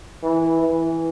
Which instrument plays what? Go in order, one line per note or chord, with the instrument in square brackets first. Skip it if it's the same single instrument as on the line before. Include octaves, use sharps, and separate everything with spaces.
[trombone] E3
E3